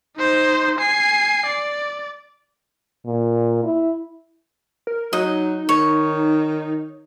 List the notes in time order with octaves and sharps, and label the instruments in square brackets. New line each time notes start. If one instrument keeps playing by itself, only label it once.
[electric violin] D#4 C5
G#5 C7
D5
[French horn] A#2
E4
[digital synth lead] A#4
[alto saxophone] F#3 [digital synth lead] D#4 [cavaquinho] D#5
[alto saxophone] D#3 [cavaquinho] C#5